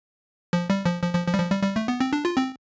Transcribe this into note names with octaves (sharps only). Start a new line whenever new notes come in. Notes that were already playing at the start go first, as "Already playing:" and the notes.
F3
G3
F3
F3
F3
F3
G3
F3
G3
G3
A3
B3
C4
D4
F4
C4